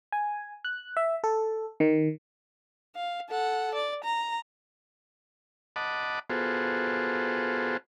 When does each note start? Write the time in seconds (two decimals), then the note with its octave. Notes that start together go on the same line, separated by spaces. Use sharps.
0.12 G#5
0.65 F#6
0.97 E5
1.24 A4
1.80 D#3
2.96 F5
3.29 A4 F#5
3.75 D5
4.04 A#5
5.76 D#5 F#5 A5 B5 D6
6.30 B3 F4 F#4 G#4 A4 C5